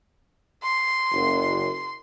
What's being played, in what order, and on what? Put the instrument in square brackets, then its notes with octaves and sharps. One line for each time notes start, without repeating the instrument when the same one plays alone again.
[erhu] C6
[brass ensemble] F#1